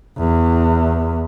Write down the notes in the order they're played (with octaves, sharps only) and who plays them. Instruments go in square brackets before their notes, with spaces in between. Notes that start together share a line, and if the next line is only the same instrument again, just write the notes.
[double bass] E2